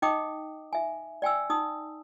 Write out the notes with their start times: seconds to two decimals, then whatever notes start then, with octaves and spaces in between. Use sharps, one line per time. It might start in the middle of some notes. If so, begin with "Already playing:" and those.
0.02 D#4 D#5 G5 D6 D#6
0.73 E5 G#5
1.22 D5 G5 G#5 E6
1.50 D#4 D#6